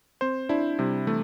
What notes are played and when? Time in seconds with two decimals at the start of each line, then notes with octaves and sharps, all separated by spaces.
0.21 C4 C5
0.49 D4 E4
0.79 C3 G3
1.07 E3 A3